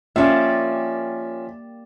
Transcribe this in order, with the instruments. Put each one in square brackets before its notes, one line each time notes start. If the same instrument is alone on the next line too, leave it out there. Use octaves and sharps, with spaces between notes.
[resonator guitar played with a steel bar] F3 C#4 [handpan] A#3 G4 D5 [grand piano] E5